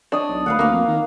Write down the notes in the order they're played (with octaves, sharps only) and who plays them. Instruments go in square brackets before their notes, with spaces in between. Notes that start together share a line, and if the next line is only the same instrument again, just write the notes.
[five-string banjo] D4 [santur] C#5 D#5
[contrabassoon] B1
[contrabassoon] D2 [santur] B4 F5 F#5
[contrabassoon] D2 [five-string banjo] A#3 [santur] F5 A#5
[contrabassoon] F2
D#3